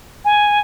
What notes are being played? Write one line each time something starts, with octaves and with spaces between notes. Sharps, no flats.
G#5